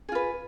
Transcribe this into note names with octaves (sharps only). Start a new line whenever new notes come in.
F4 G#4 B4